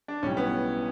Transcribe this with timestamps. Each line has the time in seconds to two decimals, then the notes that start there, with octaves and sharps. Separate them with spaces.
0.08 D4
0.23 B1 A2 G3 C#4
0.37 B3